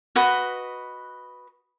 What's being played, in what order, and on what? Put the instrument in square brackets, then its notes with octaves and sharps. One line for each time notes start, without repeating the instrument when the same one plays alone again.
[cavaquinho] F#4 B4 D#5